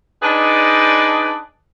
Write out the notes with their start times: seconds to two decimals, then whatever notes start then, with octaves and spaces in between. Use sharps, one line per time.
0.23 D4 D#4 G#4 B4 D5